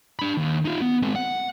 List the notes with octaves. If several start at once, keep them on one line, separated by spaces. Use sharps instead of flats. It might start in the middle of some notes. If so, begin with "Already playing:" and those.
D4 B5
D#2
D#4 F4
B3
G#3 C4
F#5